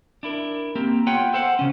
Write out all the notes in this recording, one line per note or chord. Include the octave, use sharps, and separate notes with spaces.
D4 E4 A#4
A#3 C4 G4
B3 F4 B4 C#5 F#5 G5
A4 C5 F5 F#5
C#3 C#4